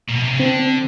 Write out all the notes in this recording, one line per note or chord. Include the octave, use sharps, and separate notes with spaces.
A#2
B2
C3
C#3
D3 C4
C4